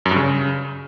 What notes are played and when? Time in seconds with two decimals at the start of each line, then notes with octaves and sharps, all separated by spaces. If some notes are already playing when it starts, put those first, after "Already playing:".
0.06 F#2
0.11 G2
0.16 C#3